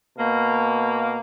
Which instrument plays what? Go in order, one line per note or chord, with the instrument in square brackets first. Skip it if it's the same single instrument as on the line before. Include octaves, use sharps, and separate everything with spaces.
[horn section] B2 A#3